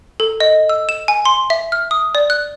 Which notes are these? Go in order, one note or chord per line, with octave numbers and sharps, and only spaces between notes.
A4
D#5
E6
E7
G#5
C6
E5
F6
D#6
D5
F#6